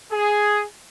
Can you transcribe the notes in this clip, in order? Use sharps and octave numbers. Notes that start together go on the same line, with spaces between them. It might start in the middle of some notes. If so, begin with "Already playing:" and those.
G#4